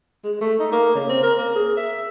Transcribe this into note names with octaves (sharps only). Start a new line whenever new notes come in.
G#3
A3
D#4
A#3
C#3
C4
A#4
A#3
G#4
E5